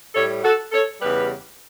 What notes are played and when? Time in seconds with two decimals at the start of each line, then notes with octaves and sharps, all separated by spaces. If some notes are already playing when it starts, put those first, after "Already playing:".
0.15 A2 G3 A4 C#5
0.44 F#4 A4
0.72 A4 C#5
1.01 E2 C#3 G3 G4 B4